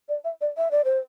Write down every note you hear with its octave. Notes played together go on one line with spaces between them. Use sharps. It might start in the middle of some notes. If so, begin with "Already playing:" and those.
D5
E5
D5
E5
D5
C5